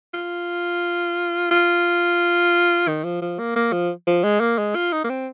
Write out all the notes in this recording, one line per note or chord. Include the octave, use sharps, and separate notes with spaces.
F4
F4
D#3
F3
F3
A#3
A#3
F3
F3
G#3
A#3
G#3
F4
D#4
A#3
C4